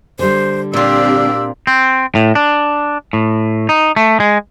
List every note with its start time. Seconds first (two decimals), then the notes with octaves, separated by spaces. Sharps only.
0.19 D3 G3 C5
0.73 A#2 C4 D4 F4 G4 E6
1.67 C4
2.15 A2
2.35 D4
3.13 A2
3.69 D#4
3.96 A3
4.20 G#3